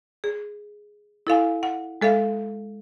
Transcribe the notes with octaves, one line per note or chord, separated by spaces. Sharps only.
G#4
E4 A4 F5 G#5
F#5
G#3 A4 E5 F5